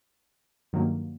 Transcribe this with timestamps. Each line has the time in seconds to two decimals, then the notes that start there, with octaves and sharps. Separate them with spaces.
0.73 G2 D#3 F#3 A#3